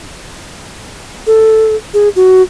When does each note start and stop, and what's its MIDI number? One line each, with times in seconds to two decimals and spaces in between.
1.27 1.76 69
1.94 2.09 68
2.16 2.42 66